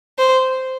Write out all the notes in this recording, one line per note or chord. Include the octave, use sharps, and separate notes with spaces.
C5